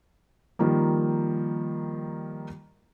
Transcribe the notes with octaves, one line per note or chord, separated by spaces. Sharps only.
D#3 F3 G3 A#3